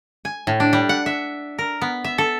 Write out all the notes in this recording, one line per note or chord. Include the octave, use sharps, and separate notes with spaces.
G#5
A2
D4
G3
F#5
E5
A#4
B3
E5
A4